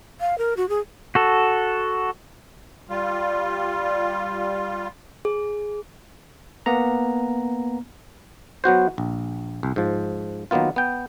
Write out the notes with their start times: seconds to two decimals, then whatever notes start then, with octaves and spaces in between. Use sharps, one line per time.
0.20 F5
0.38 A#4
0.57 F#4
0.69 G#4
1.15 F#4 A4
2.90 G3 F4
5.25 G#4
6.66 A#3 B3 A#5
8.64 F#3 B3 F#4 C5
8.98 A#1
9.63 C2
9.76 G#2 F3
10.51 D#3 F#3 A#3 B3 F4
10.76 B3 G5